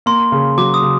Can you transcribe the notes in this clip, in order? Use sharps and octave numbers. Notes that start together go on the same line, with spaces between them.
A#3 C6
C#3
F#3 D6
D#6
C#3